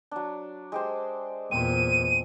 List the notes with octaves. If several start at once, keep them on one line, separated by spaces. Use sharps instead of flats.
F#3 D4
G#3 G4 C5
E2 A#2 C4 C6 D#7